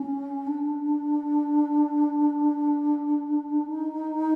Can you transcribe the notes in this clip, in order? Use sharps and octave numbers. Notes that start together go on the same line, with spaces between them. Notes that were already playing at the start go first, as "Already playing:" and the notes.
Already playing: C#4
D4
D#4